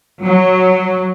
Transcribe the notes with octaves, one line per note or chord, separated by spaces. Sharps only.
F#3